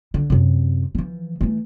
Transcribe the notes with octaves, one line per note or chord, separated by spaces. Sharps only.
D3
F#2 C3
E3 F3
E3 A3